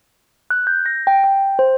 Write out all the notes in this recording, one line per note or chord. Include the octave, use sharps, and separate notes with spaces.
F#6
G6
A#6
G5
G5
C5